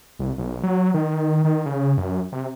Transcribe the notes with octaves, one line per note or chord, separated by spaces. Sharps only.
C2
B1
F#3
D#3
D#3
C#3
F#2
C3